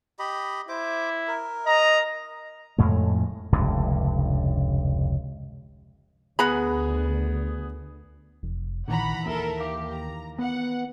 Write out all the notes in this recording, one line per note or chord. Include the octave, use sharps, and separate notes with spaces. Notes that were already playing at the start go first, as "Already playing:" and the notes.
G4 D#5 B5
E4 C5 D6
A#4
D#5 A#5
F2 A2 G#3
F1 C#2 G2 D3
D2 B3 G#4 F#5 A#5 B5
F1
A#1 D#3 E3 F#5 A#5 B5
D#2 A4 A#4 E5
G4 F5 D6 A#6
A#5
B3 F#5